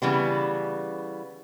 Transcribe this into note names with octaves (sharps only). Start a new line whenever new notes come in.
C#3 E3 G3 B3